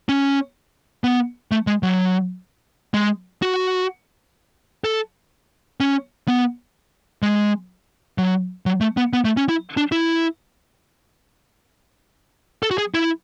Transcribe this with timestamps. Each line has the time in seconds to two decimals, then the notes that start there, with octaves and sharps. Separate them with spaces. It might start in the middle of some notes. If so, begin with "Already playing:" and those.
0.09 C#4
1.04 B3
1.52 A3
1.67 G#3
1.83 F#3
2.94 G#3
3.42 F#4
4.84 A4
5.80 C#4
6.28 B3
7.22 G#3
8.18 F#3
8.66 F#3
8.81 A3
8.97 B3
9.13 B3
9.25 A3
9.37 C#4
9.49 E4
9.77 D4
9.92 E4
12.63 A4
12.71 F#4
12.78 G#4
12.94 E4